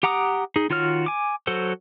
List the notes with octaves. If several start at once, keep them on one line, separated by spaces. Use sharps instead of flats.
G4 F#5 A#5 D6 D#6
D#4 G#4
D#3 F4 F#4 C#5 F6
G#5 D6
F#3 F#4 A4 C5